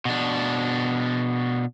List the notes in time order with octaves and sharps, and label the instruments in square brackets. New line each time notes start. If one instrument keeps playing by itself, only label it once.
[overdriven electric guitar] B2 D4